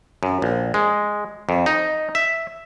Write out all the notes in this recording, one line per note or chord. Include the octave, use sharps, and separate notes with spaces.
F#2
A#1
G#3
F2
D#4
E5